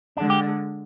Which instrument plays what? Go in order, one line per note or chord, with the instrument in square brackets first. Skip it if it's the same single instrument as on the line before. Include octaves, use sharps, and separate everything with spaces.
[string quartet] D3 G#3 [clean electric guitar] D4
[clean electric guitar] G4